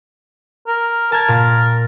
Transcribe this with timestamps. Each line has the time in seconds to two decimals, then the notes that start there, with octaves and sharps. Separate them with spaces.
0.67 A#4
1.12 A#4 A5 G#6
1.28 A#2 A6